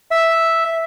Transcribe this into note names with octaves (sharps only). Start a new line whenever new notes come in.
E5